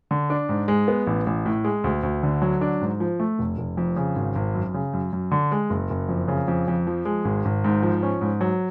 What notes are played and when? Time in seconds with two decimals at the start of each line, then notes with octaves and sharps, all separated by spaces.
0.11 D3
0.30 D4
0.49 G#2
0.68 G#3
0.88 B3
1.07 A1
1.26 A1
1.46 A2
1.64 G#3
1.84 D2
2.03 D2
2.23 D3
2.42 F#3
2.61 D4
2.81 G#2
3.00 F3
3.20 A3
3.39 F1
3.58 F1
3.77 F2
3.96 C#3
4.16 G#1
4.35 G#1
4.55 F#2
4.74 C#3
4.93 F#2
5.13 F#2
5.31 D3
5.52 G#3
5.70 F#1
5.90 F#1
6.09 F2
6.28 C#3
6.48 F2
6.68 F2
6.87 F3
7.05 G#3
7.25 G#1
7.45 G#1
7.64 G#2
7.83 F3
8.03 C#4
8.21 G#2
8.41 F#3